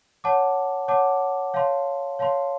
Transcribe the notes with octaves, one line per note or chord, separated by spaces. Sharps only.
C#5 F#5 A5 D6
C#5 F#5 A5 D6
C#5 F5 A5 C6
C#5 F5 A5 C6